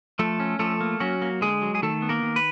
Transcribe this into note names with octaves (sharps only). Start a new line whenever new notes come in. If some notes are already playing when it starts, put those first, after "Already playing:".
F3 A3 A4
C#4
F3 A3 A4
A#3
F#3 C#4 F#4
A#3
D3 G#3 G#4
F#3
G#4
D#3 A3 A4
B3
A#3 A#4
D#3
B4